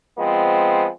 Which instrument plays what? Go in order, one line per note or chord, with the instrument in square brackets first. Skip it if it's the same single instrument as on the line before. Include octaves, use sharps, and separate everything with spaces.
[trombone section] F3 G#3 B3 C4